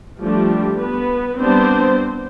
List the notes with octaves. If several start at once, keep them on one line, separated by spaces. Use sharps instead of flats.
F3 G3 A3 D4 G4
B3 B4
G3 B3 C4 D4 C5